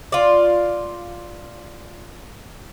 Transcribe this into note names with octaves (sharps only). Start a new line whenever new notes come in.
F4 D5